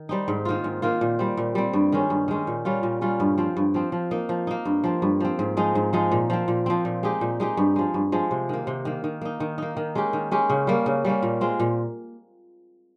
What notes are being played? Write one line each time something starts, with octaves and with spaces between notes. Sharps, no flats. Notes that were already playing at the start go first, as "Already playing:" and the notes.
Already playing: D#3
G3 C4 D#4
G#2
D#3 A#3 F4
G#2
D#3 A#3 F4
A#2
G3 C4
A#2
G3 C4
G2
D#3 G#3 C#4
G2
D#3 G#3 C#4
A#2
G3 C#4 F4
A#2
G3 C#4 F4
G2
F3 C4
G2
F3 C4
F3
A#3 D#4
F3
A#3 D#4
G2
F3 C4
G2
F3 C4
G#2
F3 G#3 D#4
G#2
F3 G#3 D#4
A#2
F3 C4
A#2
F3 C4
A#2
G#3 D#4 G4
A#2
G#3 D#4 G4
G2
F3 G#3
G2
F3 G#3
C3
D#3 A#3
C3
D#3 A#3
D#3
A#3 D#4
D#3
A#3 D#4
D#3
G#3 C#4 G4
D#3
G#3 C#4 G4
C#3
G3 A#3 C#4
C#3
G3 A#3 C#4
A#2
G#3 C4 F4
A#2